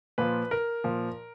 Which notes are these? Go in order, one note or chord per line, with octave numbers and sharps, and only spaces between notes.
A#2 F3 B4
A#4
A#2 F3